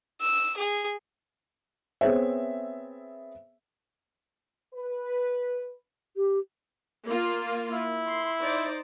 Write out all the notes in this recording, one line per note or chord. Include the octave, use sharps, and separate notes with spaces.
E6
G#4
B3 C4 G#4 C#5 E5
B4
G4
A#3 F4
E4
C6
D#4 C5 D5